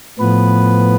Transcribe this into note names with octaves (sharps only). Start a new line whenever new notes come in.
A2 F3 B3 B4